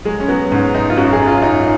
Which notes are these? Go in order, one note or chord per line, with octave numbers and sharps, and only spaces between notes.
F#3 G#3
C#4
F#3 B3
G#2 C#4
G#2 D#4
F4
F#2 F#4
G#4
F#2
F4
F#2 D#4